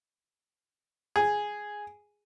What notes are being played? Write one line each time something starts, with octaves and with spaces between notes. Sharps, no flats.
G#4